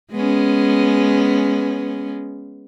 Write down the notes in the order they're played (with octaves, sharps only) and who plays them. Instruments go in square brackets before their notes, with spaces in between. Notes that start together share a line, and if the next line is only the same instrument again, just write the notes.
[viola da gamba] G#3 B3 C#4